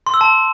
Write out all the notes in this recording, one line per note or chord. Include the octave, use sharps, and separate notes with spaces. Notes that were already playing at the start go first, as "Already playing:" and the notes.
C6
E6
A5